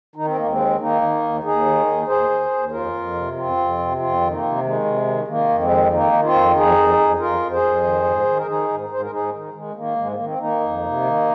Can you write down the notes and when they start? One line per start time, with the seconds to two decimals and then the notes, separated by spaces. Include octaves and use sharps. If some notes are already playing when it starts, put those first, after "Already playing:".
0.15 D#3 D#4
0.26 C4
0.37 D#2 A#3
0.46 G#3 C4
0.58 D#3
0.79 D#3 A#3 D#4
1.01 D#3
1.22 D#2
1.43 D#2 D#4 G#4
1.65 D#3
1.86 D#2
2.07 D#2 G#4 C5
2.30 D#2
2.50 D#2
2.71 F2 F4 A#4
2.94 F2
3.14 C3
3.36 F2 C4 F4
3.57 F2
3.78 C3
3.99 F2 C4 F4
4.21 D#3
4.31 A#3 D#4
4.42 C3
4.63 D#3 G#3
4.85 C3
5.06 D#3
5.28 D#3 A#3
5.49 F2
5.59 G#3 C4
5.70 D#3
5.91 D#3 A#3 D#4
6.13 D#3
6.23 C4 F4
6.33 F2
6.55 F2 D#4 G#4
6.77 F2
6.97 F2
7.19 F2 F4 A#4
7.40 F2
7.51 G#4 C5
7.62 F2
7.83 D#3
8.04 G#2
8.25 D#3
8.37 A#4
8.47 D#3 D#4 G#4
8.68 G#2
8.89 G#2 C5
9.01 A#4
9.11 G#2 D#4 G#4
9.32 D#3
9.53 D#3 G#3
9.75 D#3 A#3
9.96 G#2 G#3
10.12 A#3
10.17 D#3
10.25 C4
10.39 D#3 A#3 D#4
10.60 F2
10.82 C3
11.03 D#3